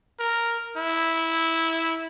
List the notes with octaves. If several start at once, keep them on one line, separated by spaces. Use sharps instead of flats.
A#4
E4